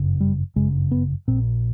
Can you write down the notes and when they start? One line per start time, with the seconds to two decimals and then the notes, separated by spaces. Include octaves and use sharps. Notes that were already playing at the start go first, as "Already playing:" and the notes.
Already playing: G1 F#2 C#3
0.20 G3
0.56 G1 F#2 C#3 G#3
0.91 B3
1.28 A#1 A#2 C4